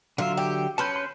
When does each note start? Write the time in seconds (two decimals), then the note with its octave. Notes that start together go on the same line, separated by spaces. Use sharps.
0.18 D3 F#3 F4 E5
0.37 G4
0.78 C#4 B4 A5 C6 G6
0.96 C6 G6